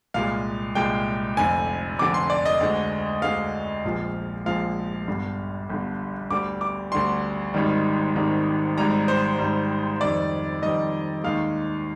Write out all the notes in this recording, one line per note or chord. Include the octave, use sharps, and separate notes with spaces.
C2 A#2 G#3 F5
C2 A#2 G#3 G5
F1 F2 D3 G#5
F1 F2 D3 D6
C6
D5
D#5
D2 D3 G#3
D2 D3 G#3 F5
A#1 A#2 F3 G#3
A#1 A#2 F3 G#3 F5
G1 G2 D3
G1 G2 D3
D2 D3 G3 D6
D6
D2 D3 G3 C6
G#1 G#2 D#3 G3
G#1 G#2 D#3 G3
G#1 G#2 G3 A#5
C5
G#1 G#2 G3
F2 D#3 G3 D5
F2 D#3 G3 D#5
D#2 D#3 G#3 F5